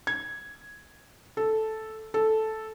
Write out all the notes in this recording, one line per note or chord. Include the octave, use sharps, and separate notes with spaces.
G#6
A4
A4